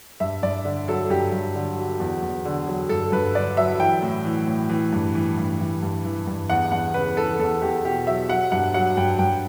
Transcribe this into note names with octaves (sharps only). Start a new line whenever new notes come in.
G2 E5
G2 D5
D3
F#3 A4
G2 G4
G2
D3
F#3
E2
E2
D3
F#3
G2 A4
G2 B4
D3 D5
F#3 E5
E3 G5
A2
E3
A2
E3
G2
E3
G2
E3
G2
E3
G2
E2 F#5
E2 F#5
C#3 B4
E3 A4
E2 A4
E2 G4
B2 G4
F#3 E5
F#3 F#5
G2 F#5
F#3 F#5
G2 G5
G2 G5